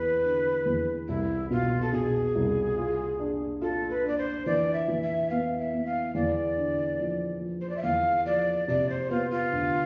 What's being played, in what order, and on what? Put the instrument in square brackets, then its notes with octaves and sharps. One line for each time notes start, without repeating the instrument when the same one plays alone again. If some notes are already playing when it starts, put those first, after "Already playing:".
Already playing: [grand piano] E2 [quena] B4
[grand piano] D3
E2
[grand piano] C2 [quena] E4
[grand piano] B2 [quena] F4
[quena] A4
[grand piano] B2 [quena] G#4
[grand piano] C2
F4
D4
[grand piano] F4 [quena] A4
[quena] B4
[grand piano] D4 [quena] D5
[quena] C5
[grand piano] E3 [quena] D5
[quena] E5
[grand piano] E3
[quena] E5
[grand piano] B3 [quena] F5
[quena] E5
[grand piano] B3
[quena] F5
[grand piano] E2 [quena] D5
[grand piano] D3
F3
F3
[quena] C5
D5
E5
[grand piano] E2 [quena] F5
[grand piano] F3 [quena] D5
[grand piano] C3 [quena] D5
[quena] C5
[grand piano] B3 [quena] F4
[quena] F4
[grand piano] D2